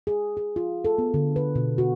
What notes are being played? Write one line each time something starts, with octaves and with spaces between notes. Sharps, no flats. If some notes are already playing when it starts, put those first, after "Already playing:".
G#4
G#4
F4
A4
B3
D3
B4
B2
F#4